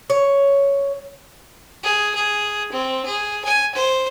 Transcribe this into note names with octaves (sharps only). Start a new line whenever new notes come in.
C#5
G#4
G#4
C4
G#4
G#5
C5